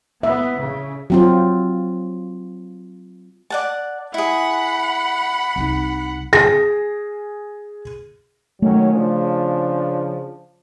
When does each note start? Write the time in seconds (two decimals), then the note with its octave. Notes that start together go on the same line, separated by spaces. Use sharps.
0.23 B3 E5
0.57 C#3
1.10 F#3 C4 F4
3.50 D5 F#5 A5
4.14 E4 G#4 F#5 B5
5.56 C2 D#4
6.33 G#4 A#6
8.62 D#3 F#3 A3 C#4
8.92 C#3 F3 D4